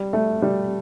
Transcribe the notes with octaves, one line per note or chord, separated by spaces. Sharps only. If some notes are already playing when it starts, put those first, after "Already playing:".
Already playing: G3
A3
G3